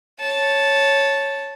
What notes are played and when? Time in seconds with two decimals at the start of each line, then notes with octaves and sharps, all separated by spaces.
0.20 C#5 A5